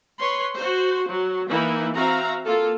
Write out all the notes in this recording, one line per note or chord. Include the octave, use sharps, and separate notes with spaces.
B4 C#5 C6
F#4 C5
F#3
E3 A#3 D#4 E4
C4 F#4 E5 F5 A#5
A#3 F4 A4